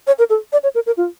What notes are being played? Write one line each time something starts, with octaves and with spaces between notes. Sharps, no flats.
C#5
A#4
A4
D5
C#5
A#4
A#4
F4